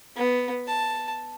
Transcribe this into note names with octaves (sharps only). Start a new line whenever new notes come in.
B3
A5